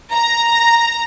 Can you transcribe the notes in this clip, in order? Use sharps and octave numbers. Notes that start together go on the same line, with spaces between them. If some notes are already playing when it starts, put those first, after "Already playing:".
A#5